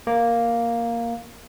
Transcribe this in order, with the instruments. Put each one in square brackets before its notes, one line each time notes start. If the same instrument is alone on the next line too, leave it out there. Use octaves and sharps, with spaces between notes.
[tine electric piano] A#3